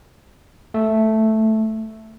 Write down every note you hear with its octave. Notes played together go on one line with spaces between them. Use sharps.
A3